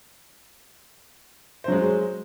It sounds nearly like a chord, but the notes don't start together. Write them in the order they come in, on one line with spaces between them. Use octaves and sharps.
C5 F#3 G#3